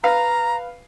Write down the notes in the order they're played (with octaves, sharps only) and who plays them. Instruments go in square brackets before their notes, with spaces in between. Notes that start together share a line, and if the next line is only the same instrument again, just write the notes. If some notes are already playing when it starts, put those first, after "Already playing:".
[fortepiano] B4 F5 [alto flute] A#5